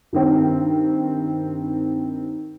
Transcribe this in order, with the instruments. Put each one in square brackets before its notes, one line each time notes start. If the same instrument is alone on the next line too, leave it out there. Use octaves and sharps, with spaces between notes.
[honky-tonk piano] G2 D#3 C4